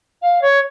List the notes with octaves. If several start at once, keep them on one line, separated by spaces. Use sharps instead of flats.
F5
C#5